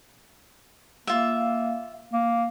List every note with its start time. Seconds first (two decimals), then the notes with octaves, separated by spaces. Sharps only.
1.07 A#3 F4 E5
2.12 A#3